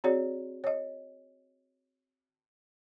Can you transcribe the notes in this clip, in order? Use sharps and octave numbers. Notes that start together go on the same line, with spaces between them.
C4 F#4 G#4 C#5 D5
C#5 D#5